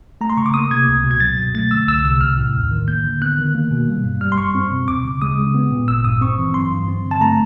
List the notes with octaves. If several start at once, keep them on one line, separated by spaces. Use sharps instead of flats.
A3 A#5
C6
C#3 C#6
D6
A#3 D#6
C3 G#6
C#2
B2
G#6
F#3 A6
G2
A3 A6
D3 E6
C2 E6
C3 E6
B1 F6
A2
D#2
D#3
A#3 G6
D3
B3 F#6
D#3
A#3
B2
G3
G2
G3 F6
C6
F#2 C#6
C4
B2
D2 D6
C#3
G#3 D#6
C#3
B3
A#2
G#1 E6
G2 D#6
C4 C#6
E3
F#3 C6
G2
C4
D3
A5
A3 A#5